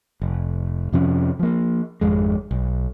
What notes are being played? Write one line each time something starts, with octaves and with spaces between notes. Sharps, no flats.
F1
F2 C3 F3 C#4
F3 A#3
G#1 F2 G#3
B1